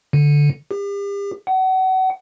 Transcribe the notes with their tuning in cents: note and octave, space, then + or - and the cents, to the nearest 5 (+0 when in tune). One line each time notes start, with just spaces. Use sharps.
D3 -5
G4 +40
F#5 +30